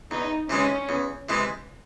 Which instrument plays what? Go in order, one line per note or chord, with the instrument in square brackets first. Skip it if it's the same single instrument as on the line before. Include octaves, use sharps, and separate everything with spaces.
[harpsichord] E2 [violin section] D#4
[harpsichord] C3 E3 G#3 [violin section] C#4
[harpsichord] E2
C3 E3 G#3